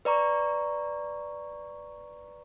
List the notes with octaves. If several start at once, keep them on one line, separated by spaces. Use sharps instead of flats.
B4 D5 A#5 C#6